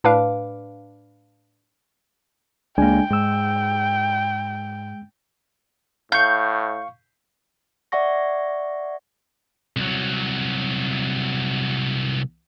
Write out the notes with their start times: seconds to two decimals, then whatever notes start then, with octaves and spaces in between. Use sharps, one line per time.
0.04 A2 D4 B4 F5 D6
2.78 C#2 G#3 A#3 D4 G5 G#5
3.10 G#2 G#3 E6
6.12 A2 F5 C#6 G6
7.92 D5 E5 F#5 C#6 A#6
9.77 C2 F#3